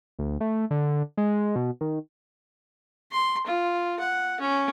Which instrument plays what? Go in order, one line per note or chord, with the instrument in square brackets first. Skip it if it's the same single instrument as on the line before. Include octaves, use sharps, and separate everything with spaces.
[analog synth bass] D2
A3
D3
G#3
B2
D#3
[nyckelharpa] C6
F4
F#5
C#4